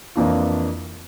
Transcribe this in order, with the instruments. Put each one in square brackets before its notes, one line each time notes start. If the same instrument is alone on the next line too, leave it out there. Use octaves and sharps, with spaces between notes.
[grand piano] F2 E3 A#3 D4 F4